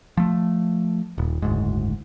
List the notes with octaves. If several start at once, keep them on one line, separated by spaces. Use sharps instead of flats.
F3 A3
D#1
F#1 D2 G#2